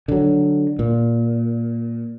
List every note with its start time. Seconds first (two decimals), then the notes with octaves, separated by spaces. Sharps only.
0.08 D3 F#3
0.79 A#2